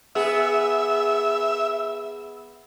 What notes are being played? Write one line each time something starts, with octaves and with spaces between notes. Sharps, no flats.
B3 G#4 E5